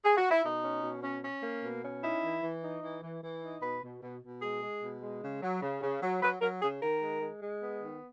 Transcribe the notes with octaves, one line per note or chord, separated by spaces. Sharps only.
G#4
F#4
E4
B2 D#4
C#4
B2
C#4
C#4
A#3
B2
C#4
D#4 E4
E3
E3
D#4
E3
E3
E3
D#4
B2 B4
B2
B2
B2
G#3 G#4
G#3
B2
G#3
C#3
F#3
C#3
C#3
F#3
F#3 B4
F#3 A#4
C#3 G#4
D#3 A#4
G#3
G#3
G#3
B3
D#3